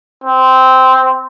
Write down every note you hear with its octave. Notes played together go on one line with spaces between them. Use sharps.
C4